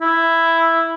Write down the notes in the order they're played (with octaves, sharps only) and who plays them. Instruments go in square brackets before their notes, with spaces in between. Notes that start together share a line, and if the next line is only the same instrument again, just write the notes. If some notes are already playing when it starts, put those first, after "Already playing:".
[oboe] E4